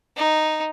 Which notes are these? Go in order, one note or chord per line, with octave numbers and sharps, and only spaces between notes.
D#4